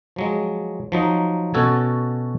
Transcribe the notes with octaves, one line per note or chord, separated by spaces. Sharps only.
F3 F#3 G#3
F3 F#3 D#4
B2 C#4 F#4 A4 G#5 A5